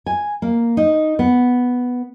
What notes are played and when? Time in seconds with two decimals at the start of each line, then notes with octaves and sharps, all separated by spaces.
0.06 G#5
0.42 A#3
0.77 D#4
1.19 B3